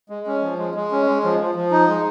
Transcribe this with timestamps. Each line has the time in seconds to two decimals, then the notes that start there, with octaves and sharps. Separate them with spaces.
0.09 G#3
0.27 C#4
0.42 F3
0.58 G#3
0.75 G#3
0.91 C#4
1.07 G#3
1.24 F3
1.40 F3
1.55 F3
1.71 D#4
1.88 G#3